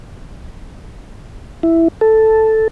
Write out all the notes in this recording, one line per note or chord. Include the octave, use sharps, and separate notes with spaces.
E4
A4